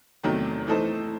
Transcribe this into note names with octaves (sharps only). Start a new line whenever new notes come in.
E2 C3 D#3 F#3 A3
E3 A3 D#4 A4 C5